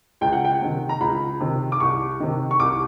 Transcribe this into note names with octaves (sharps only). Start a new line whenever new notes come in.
C#2 G5
F#5
G5
C3 D#3
A#5
C#2 B5
C3 D#3
D6
C2 C#6
C3 D#3
C#6
C2 D6